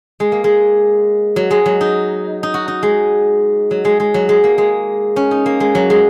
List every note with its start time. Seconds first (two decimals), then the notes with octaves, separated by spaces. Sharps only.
0.20 G#3
0.32 A#3
0.44 G#3
1.36 F#3
1.51 G#3
1.66 F#3
1.81 D#4
2.43 D#4
2.54 F#4
2.68 D#4
2.83 G#3
3.71 F#3
3.85 G#3
4.00 G#3
4.14 F#3
4.29 G#3
4.44 A#3
4.58 G#3
5.16 C#4
5.31 D#4
5.46 A#3
5.60 G#3
5.75 F#3
5.90 G#3